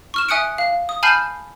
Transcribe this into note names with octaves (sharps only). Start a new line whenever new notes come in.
C#6 F6 E7
E5 G#5 D#6 F#6 C#7 D7
F5
D#6
G#5 A5 B5 F6 G6 C7